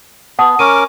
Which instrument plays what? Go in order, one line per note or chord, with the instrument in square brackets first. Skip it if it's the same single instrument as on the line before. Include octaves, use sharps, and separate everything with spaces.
[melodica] B3 [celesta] F#5 A5 D#6
[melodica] C#4 A#4 D6 [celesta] C#6 D#7